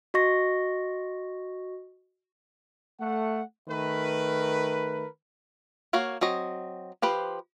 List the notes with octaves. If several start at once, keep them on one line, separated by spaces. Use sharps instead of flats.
F#4 D#5 C#6 A#6
A3 F#5
D#3 A3 A#4 B4
A#3 F#4 C#5 F5
F#3 C4 D#5
F3 G4 B4 C5